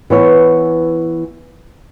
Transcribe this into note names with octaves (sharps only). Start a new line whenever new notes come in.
E3 B3 C#5